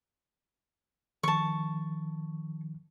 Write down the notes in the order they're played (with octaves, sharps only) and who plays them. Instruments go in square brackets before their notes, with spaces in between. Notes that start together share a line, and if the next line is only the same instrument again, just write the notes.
[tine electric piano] D#3 F3 [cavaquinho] A5 C#6